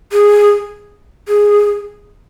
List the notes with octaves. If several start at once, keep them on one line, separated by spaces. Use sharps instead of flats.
G#4
G#4